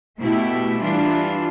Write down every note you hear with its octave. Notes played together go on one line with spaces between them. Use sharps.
B2 A3 E4 G4
E3 G3 D4 F4